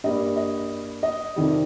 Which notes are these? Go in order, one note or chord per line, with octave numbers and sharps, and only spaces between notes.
G2 G3 A#3 D#5
D#5
D#5
F2 C3 D#3 G3